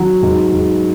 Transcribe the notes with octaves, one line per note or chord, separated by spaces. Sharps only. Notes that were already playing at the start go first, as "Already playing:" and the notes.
Already playing: F#3
G#2
G#2